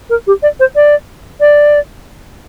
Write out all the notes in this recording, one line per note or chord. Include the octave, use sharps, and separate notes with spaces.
A#4
G4
D5
C5
D5
D5